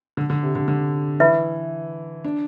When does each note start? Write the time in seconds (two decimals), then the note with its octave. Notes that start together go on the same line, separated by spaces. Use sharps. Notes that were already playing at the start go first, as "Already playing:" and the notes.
0.17 D3
0.30 D3
0.43 C3
0.55 D3
0.68 D3
1.20 E3 B4 E5 B5
2.24 D4